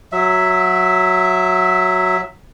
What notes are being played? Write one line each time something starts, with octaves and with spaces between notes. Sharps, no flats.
F#3 E5